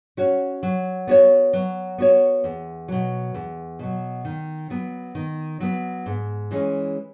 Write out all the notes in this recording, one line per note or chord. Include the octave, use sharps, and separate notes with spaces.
C#4 F#4 C#5
F#3
B3 F#4 C#5
F#3
B3 F#4 C#5
E2
B2 F#3
E2
B2 F#3
D#3
F#3 B3
D#3
F#3 B3
G#2
E3 G#3 C#4